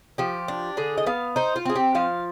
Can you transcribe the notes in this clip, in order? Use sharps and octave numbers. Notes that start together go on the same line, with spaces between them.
F3 G4
D4
D3 G#4
D#5
B3 F5
D#4 C5
F4
C4 G#4
G4
F3 F5